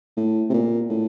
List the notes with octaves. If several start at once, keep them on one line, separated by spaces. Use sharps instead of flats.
A2
C3
A#2
A2